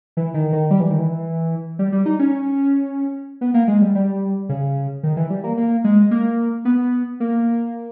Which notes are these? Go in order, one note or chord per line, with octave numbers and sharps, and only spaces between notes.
E3
D#3
D#3
G3
E3
D#3
E3
G3
G3
D#4
C#4
B3
A#3
G#3
G3
G3
C#3
D#3
E3
G3
A#3
A#3
G#3
A#3
B3
A#3